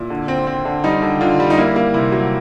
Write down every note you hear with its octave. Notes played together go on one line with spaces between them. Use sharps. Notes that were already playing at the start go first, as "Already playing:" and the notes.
Already playing: A#2 E4
D3
C4
C4
D3
G3 D#4
D3
D3 F4
G3
D#4
A#3 E4
A#3
C3 E4
F#3